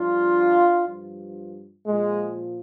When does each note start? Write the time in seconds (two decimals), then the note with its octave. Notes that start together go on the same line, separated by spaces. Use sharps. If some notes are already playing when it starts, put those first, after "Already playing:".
Already playing: G2 F3 D4 F4
0.86 G2 F3
1.86 A#2 F3 G#3